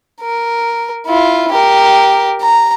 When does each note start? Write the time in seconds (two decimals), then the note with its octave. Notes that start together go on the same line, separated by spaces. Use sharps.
0.22 A#4
1.06 E4 F4
1.52 G4 A#4
2.42 A#5